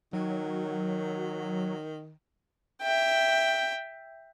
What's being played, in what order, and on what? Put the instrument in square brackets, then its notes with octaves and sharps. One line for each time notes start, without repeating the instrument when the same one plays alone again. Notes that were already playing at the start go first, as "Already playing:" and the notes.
[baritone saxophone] D#3 [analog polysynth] F#3
[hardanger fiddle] E5 G5